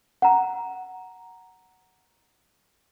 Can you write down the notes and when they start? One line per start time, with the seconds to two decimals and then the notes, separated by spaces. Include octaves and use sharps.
0.22 F#5 A#5